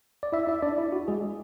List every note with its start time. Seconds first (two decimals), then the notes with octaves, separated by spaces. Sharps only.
0.23 D5
0.32 E4 E5
0.48 E4 E5
0.62 D4 D5
0.78 E4
0.92 F#4
1.08 G#3 G#4